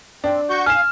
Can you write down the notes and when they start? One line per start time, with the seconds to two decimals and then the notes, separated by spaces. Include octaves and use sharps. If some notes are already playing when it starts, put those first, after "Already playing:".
0.24 C4 D4
0.50 F#4 C#6 G6
0.66 F5 G#5 F6 E7